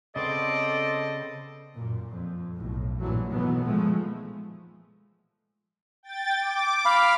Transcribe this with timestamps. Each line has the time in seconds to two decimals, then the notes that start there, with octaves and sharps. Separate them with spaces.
0.16 C#3 B3 C4 A4 C5 D5 D#5
1.76 F#2 A#2
2.08 F2
2.55 B1 A2
2.99 A#1 G2 A#2 E3 F#3 A3
3.30 B2 D#3 E3 F#3 A3 B3
3.63 A#2 F3 G#3 A3
6.03 G5 A6
6.41 D6
6.86 F5 B5 F6